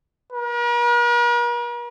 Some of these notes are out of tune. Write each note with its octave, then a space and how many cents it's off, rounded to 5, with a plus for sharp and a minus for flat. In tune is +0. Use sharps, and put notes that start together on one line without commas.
A#4 +45